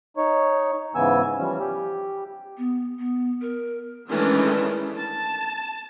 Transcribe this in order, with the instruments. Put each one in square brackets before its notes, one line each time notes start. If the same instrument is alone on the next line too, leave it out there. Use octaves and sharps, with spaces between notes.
[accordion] D#4 C#5
G#2 C#3 E3 B3 G#5 E6
E3 F3 G3 C#4
G4
[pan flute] B3
B3
A#4
[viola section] D#3 E3 G#3 A3 C#4 D4
A5